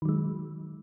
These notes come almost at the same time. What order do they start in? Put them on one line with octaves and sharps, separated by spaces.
D#3 F#3 G#3